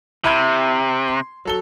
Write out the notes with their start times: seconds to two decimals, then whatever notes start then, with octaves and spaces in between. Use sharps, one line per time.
0.24 C3 E4 B5 G#6
1.08 C6
1.45 F#3 A4 G7